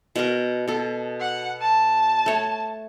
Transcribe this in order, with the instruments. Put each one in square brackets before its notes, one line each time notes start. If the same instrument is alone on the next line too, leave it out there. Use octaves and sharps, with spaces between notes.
[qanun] B2 F#4 A#4
B2 A4
[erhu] F#5
A5
[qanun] A3 C#5